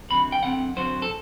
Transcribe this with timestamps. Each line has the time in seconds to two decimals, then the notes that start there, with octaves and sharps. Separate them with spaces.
0.10 F#2 D3 F#3 C4 B5
0.32 G5
0.43 F#2 D3 F#3 C4 F#5
0.76 F#2 D3 F#3 C4 C5
1.02 A4